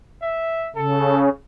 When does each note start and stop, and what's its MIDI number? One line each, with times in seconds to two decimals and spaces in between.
0.22 0.70 76
0.76 1.29 49
0.76 1.20 69